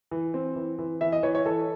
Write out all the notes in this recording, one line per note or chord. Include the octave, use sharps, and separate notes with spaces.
E3
C4
E3
E3
E3 E5
D#5
E3 C#5
C#5
E3 A4